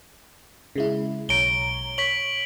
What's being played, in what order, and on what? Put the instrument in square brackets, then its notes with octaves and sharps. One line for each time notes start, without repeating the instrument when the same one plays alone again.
[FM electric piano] C#3 G#3 E4
[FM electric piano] B1 C#5 A#5 [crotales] D7 G7
[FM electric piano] C#5 [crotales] B6 F#7